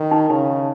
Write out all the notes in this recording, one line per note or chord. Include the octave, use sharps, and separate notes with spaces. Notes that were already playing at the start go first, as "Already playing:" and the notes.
Already playing: D#3
D#4
C#3 D#4